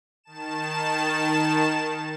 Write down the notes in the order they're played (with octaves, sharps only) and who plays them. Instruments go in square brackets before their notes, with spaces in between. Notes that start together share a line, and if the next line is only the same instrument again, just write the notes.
[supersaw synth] D#3 A5 E7